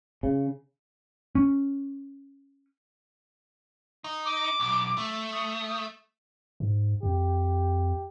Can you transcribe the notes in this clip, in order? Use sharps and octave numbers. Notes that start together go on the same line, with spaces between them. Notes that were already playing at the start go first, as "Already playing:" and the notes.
C#3
C#4
D#4
D6
B1
A3
D#6
G#2
F2 G4